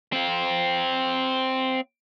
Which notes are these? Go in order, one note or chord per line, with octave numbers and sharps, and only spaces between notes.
C4 F4